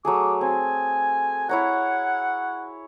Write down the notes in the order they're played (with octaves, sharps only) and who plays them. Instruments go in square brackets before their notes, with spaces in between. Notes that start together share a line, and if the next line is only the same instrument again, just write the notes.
[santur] F#3 A3 G#4 [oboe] D6
[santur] C4 [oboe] G#5
[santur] E4 C#5 A#5 [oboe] F#5